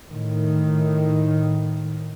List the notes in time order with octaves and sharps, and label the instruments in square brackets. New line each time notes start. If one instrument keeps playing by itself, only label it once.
[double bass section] A2 D#3